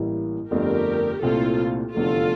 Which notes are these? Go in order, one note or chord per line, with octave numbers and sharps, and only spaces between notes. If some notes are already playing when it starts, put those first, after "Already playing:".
Already playing: A1 A2 G3 A#3 E4
G1 F2 D3 A3 D4 G4 A#4
C2 A#2 A3 C4 E4 F4 A4
F1 E2 D3 A3 F4 A4